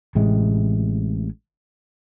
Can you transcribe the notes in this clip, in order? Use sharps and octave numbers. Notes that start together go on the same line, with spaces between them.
A1 A2 C3 G#3